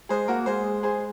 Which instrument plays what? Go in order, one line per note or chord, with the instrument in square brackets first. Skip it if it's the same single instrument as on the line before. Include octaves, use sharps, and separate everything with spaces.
[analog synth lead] G#3 [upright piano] G#4 C5
[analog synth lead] A#3 [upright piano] F#4 A#4
[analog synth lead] G#3 [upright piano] G#4 C5
[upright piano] G#4 C5